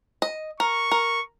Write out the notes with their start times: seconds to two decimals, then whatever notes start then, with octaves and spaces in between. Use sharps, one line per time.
0.22 D#5
0.60 A#4 C#6
0.91 A#4